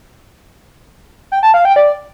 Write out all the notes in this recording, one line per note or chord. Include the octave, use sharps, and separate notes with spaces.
G5
A5
F5
G5
D5